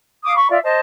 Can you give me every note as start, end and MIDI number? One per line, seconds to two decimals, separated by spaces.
0.24 0.35 77
0.24 0.35 86
0.24 0.35 87
0.35 0.48 83
0.35 0.48 85
0.49 0.58 65
0.49 0.58 74
0.49 0.58 76
0.63 0.80 72
0.63 0.80 75
0.63 0.80 81